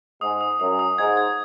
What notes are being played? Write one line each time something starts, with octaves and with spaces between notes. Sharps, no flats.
G#2 D#6
D#6
F#2 D#6
D#6
G#2 G#6
G#6